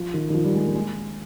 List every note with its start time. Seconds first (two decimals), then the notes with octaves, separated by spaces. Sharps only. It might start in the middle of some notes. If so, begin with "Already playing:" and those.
Already playing: F3
0.14 D#3
0.30 D#3
0.34 F3
0.44 G3
0.55 G#3
0.65 A#3
0.75 G#3